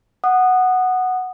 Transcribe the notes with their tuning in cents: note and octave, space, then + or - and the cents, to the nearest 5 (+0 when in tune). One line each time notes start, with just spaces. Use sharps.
F#5 +0 D#6 -20